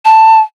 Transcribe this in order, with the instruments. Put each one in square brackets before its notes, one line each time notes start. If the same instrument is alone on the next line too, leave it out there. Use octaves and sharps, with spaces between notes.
[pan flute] A5